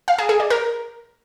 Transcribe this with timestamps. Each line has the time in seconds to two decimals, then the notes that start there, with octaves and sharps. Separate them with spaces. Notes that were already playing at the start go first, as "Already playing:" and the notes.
0.08 F5
0.18 G#4
0.29 G#4
0.40 D5
0.50 A#4